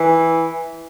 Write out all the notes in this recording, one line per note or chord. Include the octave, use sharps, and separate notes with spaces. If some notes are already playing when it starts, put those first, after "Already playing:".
Already playing: E3